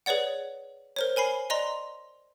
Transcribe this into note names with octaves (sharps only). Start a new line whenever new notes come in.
G#4 B4 C#5 D5 F#5
A#4 C5 C#5
A#4 G#5 B5 C7
D5 D#5 A#5 C6